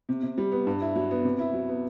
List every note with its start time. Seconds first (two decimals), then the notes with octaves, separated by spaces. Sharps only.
0.09 C3
0.23 C3
0.38 G3
0.52 B3
0.67 G2
0.81 E4
0.96 F#3
1.11 B3
1.24 C3
1.39 E4
1.54 F#3
1.69 B3